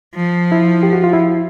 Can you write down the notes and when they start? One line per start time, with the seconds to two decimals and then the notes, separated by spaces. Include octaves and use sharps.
0.15 F3
0.52 E4
0.83 G4
0.93 F#4
1.04 F4
1.13 E4